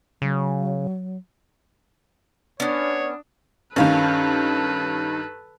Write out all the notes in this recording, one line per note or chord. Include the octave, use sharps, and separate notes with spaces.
C#3 F#3
B3 C#4 D4 C#5 D5 D#6
G2 D#3 C#4 A4 B4 F5